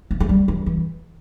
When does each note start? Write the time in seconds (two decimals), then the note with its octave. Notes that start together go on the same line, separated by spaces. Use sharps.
0.11 B3
0.20 A3
0.29 G3
0.48 E3
0.66 E3